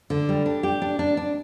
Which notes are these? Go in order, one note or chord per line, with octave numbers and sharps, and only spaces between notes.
D3
G3
D4
G4
D4
D4
D4